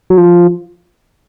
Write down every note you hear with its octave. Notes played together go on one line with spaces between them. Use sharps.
F#3
F3